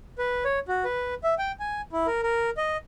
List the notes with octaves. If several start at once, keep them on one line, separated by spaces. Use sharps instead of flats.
B4
C#5
F#4
B4
E5
G5
G#5
E4
A#4
A#4
D#5